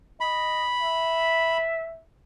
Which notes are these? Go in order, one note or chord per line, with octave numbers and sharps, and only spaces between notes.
D#5 B5
E5